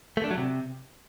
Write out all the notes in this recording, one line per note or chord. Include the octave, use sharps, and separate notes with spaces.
A3
D4
F#3
C3